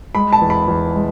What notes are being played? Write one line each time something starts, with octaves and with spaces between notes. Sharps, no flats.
G#3 B5
A5
E2
B5
E2
G#3